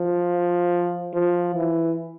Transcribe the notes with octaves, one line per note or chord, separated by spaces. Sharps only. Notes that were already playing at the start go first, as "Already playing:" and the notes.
Already playing: F3
F3
E3